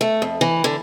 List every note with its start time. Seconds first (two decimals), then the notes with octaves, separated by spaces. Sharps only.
0.01 A3
0.22 F2
0.41 E3
0.64 D3